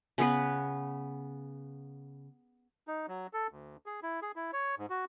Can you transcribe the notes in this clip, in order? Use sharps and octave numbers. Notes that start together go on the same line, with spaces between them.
C#3 B3 B4
D#4
F#3
A4
D2
G#4
E4
G#4
E4
C#5
G#2
F#4